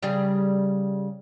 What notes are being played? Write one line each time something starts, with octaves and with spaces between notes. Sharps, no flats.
C#3 G3 G#4